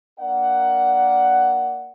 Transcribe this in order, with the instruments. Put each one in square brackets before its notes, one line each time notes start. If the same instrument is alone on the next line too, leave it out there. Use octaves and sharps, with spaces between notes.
[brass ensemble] A#3 D4 A#4 D5 F#5